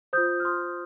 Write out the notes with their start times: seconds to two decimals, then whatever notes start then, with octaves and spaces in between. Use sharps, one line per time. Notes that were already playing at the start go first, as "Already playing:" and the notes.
0.13 F4 C5 D#6 G6
0.40 F6
0.45 C6 D#6